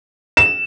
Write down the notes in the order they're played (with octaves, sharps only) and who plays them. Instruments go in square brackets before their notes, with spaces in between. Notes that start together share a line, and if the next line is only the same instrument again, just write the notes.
[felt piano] E7